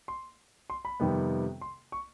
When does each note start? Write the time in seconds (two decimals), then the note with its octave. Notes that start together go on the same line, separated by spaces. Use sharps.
0.08 C6
0.70 C6
0.85 B5
1.00 F2 C3 D#3 G3 B3
1.61 C6
1.92 C#6